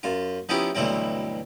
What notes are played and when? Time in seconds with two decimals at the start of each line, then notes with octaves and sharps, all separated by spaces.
0.03 F#2 F4
0.49 F3 B3 C#4 D#4 E4 G4
0.75 D2 G2 B2 E3 F#3 C4